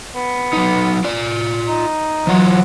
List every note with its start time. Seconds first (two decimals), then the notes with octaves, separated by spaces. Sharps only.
0.15 B3
0.53 F#3 D#4
1.04 F4 D5
1.69 D#4
2.27 E3 F#3 F4 C#5